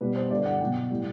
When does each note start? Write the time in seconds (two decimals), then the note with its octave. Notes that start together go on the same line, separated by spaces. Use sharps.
0.01 B2 G3 B4
0.16 C5
0.31 G2 D3 G3 D5
0.45 F#5
0.61 B2 F#3 G5
0.90 A2 G3